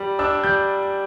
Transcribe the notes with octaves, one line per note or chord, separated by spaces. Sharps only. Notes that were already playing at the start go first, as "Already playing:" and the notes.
Already playing: G3
D4 E6
G3 G6